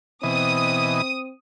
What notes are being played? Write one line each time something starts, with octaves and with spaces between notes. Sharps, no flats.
B2 E3 C4 D#5 D#6